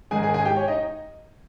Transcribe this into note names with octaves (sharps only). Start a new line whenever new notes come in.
G#2 D#3 G#3 G#4 G#5
G#4 G#5
G#4 G#5
G4 G5
C#5
D#4 D#5